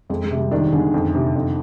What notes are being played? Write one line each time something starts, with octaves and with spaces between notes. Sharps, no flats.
F2 G#3
G#3
C3
G3
D#3 D4
D3 G#4
F2
C3
F2